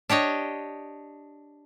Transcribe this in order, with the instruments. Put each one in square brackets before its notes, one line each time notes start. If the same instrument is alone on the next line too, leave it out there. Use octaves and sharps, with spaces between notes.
[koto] D4 G4 C#5 D#5